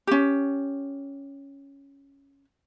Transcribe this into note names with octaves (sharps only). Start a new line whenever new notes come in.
C#4 G4